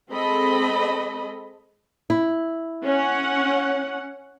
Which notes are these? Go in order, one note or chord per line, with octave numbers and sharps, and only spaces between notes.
G#3 C4 A4 D#5 B5
E4
C#4 F#5